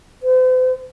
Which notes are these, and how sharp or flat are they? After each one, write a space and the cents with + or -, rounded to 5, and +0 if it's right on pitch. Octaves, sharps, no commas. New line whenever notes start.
C5 -40